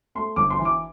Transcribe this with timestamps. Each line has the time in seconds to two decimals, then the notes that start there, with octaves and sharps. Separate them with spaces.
0.15 A3 C6
0.36 G1 D6
0.50 C6
0.58 E3
0.65 D6